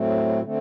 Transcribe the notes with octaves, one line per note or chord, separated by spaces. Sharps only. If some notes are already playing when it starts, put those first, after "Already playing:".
Already playing: A2 F#3 A3 C4
D3 A3 C4